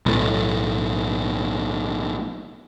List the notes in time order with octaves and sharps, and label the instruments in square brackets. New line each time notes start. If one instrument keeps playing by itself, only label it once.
[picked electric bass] B1 A2